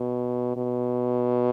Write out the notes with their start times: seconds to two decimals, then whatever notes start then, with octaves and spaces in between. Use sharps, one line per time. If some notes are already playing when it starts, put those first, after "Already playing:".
Already playing: B2
0.57 B2